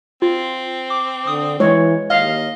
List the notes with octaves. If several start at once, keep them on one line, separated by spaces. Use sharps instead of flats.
C4 F4
D6
D3 D#6
E3 G#3 C#5
D#2 D#5 F5